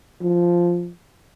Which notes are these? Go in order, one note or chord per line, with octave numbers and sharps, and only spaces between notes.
F3